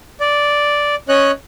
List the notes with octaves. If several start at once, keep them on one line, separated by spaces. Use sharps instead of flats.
D5
C#4 C#5 D#5 F#6